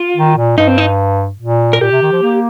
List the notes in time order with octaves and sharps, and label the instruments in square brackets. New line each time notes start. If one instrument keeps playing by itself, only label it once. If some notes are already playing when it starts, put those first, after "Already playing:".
Already playing: [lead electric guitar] F4
[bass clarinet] D#3
A#2
[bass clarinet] G2 [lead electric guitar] D#4
[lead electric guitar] C4
D#4
[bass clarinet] A#2
[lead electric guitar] A#4
[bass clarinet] A#2 [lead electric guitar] G4
[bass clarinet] C3
D#3
F3
A#3